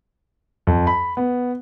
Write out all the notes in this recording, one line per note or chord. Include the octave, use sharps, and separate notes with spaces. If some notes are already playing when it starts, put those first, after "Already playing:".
F2
B5
B3